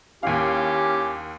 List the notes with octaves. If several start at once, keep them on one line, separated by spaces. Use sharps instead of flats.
D#2 C#4 E4 G4 F5